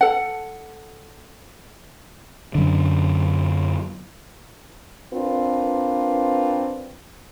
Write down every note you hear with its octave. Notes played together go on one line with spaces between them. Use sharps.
A4 F#5
F#2 D3
C4 D4 F4 A#4 B4